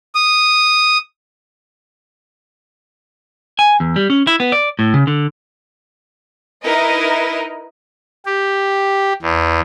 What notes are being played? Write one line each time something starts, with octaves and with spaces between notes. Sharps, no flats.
D#6
G#5
E2
G3
C#4
E4
B3
D5
A2
C#3
D3
D#4 E4 A#4 B4 D#5
G4
E2